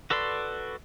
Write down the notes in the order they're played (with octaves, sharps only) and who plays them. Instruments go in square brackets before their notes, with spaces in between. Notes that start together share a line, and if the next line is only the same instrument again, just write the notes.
[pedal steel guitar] F#4 A4 B4 D5 C6